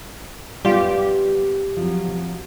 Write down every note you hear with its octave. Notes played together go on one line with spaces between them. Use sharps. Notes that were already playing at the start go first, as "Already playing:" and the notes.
F#2 G3 B3 F4 G4
F3 F#3 C4